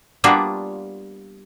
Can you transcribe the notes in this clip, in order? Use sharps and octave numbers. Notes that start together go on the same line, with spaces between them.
G3 A#3 B3 D4 F4 F#4